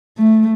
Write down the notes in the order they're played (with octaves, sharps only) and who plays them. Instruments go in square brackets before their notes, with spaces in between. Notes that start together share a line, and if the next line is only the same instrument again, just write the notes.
[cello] A3